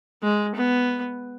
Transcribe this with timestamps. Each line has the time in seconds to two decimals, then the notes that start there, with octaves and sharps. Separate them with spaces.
0.23 G#3
0.55 B3